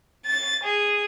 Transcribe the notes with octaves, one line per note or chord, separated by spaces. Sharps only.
A6
G#4